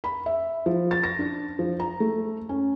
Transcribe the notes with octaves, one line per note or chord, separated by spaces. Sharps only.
B5
E5
F3
A6
A#6
D4
F3
A#5
A3
C#4